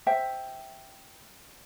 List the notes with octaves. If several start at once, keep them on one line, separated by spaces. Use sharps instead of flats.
C5 E5 G5